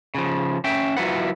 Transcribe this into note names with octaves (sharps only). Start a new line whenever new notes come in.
C#3 F3
C#4 E5 G5
F#3 E4 F4 B4 F#5